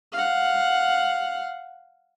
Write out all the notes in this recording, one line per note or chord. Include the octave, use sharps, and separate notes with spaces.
F5 F#5